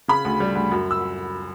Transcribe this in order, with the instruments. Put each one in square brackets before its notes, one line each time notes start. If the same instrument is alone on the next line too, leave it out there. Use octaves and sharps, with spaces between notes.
[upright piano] C#3 B5
D2
G3
D2
F#2
E6